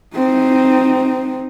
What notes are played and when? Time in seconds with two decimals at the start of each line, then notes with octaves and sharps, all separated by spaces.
0.15 C4 D#4